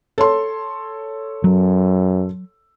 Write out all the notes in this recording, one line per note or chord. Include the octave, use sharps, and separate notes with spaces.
A4 C#5 C6
F#2 F#3